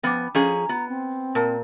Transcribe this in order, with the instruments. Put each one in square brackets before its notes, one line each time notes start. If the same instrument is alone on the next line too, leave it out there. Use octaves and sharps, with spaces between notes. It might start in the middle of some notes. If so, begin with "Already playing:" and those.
[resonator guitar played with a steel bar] F3 B3 [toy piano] C#4 B5 D6
[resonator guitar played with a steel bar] F3 C#4 G#4 [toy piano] D#5 [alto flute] A#5
[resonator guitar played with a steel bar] B3 [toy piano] F4
[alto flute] C4
[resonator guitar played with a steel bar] A#2 [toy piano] A#4 A5 A#5